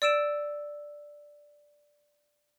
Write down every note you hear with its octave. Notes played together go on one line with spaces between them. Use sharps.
D5 E6 D7 E7